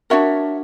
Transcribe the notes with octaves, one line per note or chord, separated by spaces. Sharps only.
D4 F#4 A#4 C#5 E5